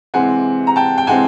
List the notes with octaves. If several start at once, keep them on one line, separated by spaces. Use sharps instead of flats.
C3 E3 G#3 C4 F#5 G#5
A#5
G5 A5
G5
C3 E3 G#3 C4 F#5 G#5